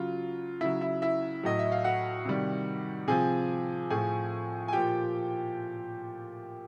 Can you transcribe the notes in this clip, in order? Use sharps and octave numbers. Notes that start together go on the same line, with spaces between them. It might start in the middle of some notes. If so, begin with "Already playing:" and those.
Already playing: C#3 F#3 F4
C#3 F#3 E4 E5
E4 E5
E4 E5
A2 F#3 D#5
E5
F5
F#4 F#5
C3 D#3 G3
C3 F3 G#4 G#5
A2 F3 G#4 G#5
G#5
A#2 F3 G4 G5